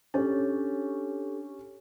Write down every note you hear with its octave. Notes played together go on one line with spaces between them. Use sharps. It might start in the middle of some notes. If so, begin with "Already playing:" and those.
C#4 D4 G4 A4 C#5